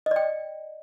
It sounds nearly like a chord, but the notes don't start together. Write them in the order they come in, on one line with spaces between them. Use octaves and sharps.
D#5 D5 G5